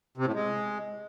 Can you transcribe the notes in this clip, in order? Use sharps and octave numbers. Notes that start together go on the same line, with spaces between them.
C3
A2
G#3